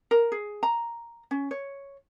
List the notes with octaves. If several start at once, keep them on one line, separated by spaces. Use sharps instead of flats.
A#4
G#4
A#5
C#4
C#5